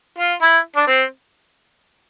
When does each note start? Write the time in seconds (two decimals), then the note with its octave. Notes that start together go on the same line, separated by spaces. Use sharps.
0.18 F4
0.42 E4
0.76 D4
0.87 C4